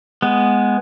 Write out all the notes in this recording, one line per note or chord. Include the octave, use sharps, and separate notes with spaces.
G#3 B3